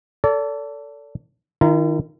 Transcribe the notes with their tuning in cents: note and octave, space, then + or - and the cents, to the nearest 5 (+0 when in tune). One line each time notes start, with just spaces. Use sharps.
A4 +15 D5 -40
D#3 +0 F4 -45 A#5 +0